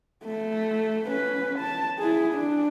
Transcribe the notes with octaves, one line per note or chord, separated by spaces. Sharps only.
A3
C#4 B4
A5
E4 G#4
D4